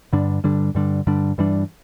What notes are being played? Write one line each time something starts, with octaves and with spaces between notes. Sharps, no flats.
G2 D3 G3 D4
G2 D3 G3 D4
G2 D3 G3 D4
G2 D3 G3 D4
G2 E3 G3 D4